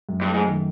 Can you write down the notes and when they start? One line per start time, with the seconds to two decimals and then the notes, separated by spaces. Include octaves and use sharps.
0.09 F#2
0.22 G2
0.27 A3
0.34 G#2
0.46 D#3